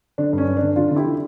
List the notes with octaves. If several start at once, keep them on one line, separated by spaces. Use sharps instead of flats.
D3 D4
G2 C#4
G2
D4
D3
D3 D4 F4
D3
E4 G4
D3